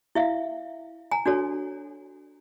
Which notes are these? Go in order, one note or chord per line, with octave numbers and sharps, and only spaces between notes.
E4 E5 F5
G#5 A#5
D4 F#4 A4 C#5